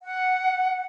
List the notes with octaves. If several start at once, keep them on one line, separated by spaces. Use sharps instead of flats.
F#5